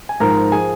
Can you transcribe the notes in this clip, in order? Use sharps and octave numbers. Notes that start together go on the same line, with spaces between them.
G#5
G#2 F3 A#4 A#5
F3 G#4 G#5